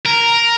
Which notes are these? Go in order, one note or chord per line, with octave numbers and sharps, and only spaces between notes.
A#4